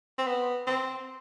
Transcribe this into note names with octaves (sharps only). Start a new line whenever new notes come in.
C4
B3
C4